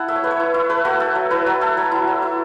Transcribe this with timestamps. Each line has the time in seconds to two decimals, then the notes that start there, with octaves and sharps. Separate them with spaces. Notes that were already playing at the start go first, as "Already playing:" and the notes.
Already playing: E4 F#5 A5
0.08 A3 E5
0.16 C#5
0.23 A3 B4
0.31 C#5
0.40 E4
0.54 E4
0.70 A3 B4
0.85 A3 F#4
1.00 A3 A4
1.15 F#3
1.31 E4 B4
1.46 F#3
1.61 A3 A4
1.77 F#3
1.92 E4
2.07 F#3
2.22 E4